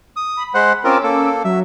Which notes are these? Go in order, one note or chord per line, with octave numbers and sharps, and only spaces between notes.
D#6
B5
G#3 C5 F#5
C4 C#4 F4 A#4 D6 E6
A#3 A4
F#3 E5